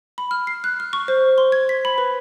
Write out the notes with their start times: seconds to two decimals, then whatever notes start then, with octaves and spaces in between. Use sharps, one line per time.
0.18 B5
0.31 F6
0.47 C7
0.64 F#6
0.80 F6
0.93 C#6
1.08 C5
1.38 C6
1.52 G#6
1.69 B6
1.85 B5
1.98 B4